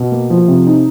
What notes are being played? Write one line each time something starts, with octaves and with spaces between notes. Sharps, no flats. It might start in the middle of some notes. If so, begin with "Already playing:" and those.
Already playing: B2
A#3
F3
C3
D#4